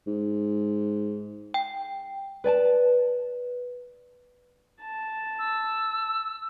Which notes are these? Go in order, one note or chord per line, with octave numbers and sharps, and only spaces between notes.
G#2
G5
B4 D5 G#5 A5
A5
E6